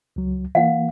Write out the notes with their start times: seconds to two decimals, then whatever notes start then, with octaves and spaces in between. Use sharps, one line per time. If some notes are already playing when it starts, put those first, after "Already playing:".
0.16 C#2 F#3
0.55 E3 A#3 F5 F#5